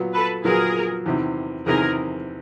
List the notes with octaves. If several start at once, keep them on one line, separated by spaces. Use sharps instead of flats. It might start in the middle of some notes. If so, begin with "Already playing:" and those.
Already playing: A#2 F#3 B3
A4 B4
A#2 F#3 B3 G#4 A#4
E2 C3 D#3
E2 C3 D#3 G#4 A#4